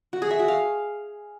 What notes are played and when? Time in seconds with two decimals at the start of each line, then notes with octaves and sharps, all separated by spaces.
0.13 F#4
0.22 G#4
0.31 E5
0.39 F#4
0.48 F5